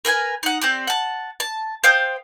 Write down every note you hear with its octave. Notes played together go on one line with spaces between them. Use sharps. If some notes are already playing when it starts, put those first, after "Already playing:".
A#4 B4 G5 G#5
D#4 F#5
C4 G4 D5
F#5 A5
A5
C5 F5 G5 D#6